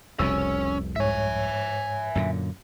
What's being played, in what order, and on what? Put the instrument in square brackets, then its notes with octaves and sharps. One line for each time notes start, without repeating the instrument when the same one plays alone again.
[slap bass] F1 C2 B2 [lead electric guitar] C#4 [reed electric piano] E6
[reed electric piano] G#2 C#5 [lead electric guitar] E5 G#5
[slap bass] F#2 A#2 D3